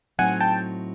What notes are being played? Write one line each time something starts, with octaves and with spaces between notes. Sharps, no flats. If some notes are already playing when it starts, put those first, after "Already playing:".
A2 F#3 A3 C4 D#4 F#5 G#5
G5 A5